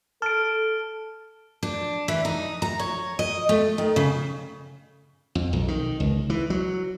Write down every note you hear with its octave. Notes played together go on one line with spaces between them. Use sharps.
A4 A5 F6 D7
D4
E3
D#4
A#5
C#5
D#5
A3
D#3
C#3
F2
B1
D#3
C#2
E3
F#3